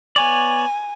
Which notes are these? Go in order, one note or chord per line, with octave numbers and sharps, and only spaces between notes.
B3 C#5 D5 G#5